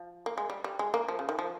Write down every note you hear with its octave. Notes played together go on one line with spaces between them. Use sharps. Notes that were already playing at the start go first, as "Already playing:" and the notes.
Already playing: F3
A#3
G#3
G3
G3
G#3
A#3
F3
C#3
D#3
F3